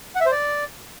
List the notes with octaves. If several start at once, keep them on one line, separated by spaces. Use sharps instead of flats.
F#5
E5
C5
D5